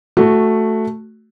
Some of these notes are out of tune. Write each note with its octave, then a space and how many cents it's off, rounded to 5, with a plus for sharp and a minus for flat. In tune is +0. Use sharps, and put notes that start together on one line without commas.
A3 +0 F#4 +0